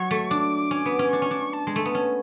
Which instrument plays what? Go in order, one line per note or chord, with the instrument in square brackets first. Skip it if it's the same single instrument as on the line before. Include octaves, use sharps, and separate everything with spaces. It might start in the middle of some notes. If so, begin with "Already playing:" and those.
Already playing: [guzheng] F#3 [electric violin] C#6
[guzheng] A3
[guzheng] D4 [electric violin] D6
[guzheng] C#4
B3
C#4
[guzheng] D4 [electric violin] C#6
[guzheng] C#4
D4
[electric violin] A5
[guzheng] G#3
A3
B3
C#4